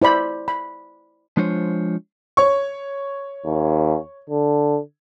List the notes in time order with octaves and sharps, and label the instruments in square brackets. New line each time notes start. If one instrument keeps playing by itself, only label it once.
[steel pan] E4 C5 D5 B5
B5
[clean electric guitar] F3 G#3 D4 F4 C5 C#5
[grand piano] C#5 C#6
[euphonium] D#2
D3